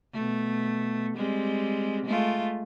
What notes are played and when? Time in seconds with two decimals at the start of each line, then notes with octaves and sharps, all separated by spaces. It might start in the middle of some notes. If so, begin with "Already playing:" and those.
0.14 B2 A3
1.16 G3 G#3 C4
2.05 G#3 A3 F4